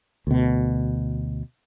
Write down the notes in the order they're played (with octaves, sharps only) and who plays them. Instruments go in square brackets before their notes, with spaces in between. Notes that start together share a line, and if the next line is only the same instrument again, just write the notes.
[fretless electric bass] D2 B2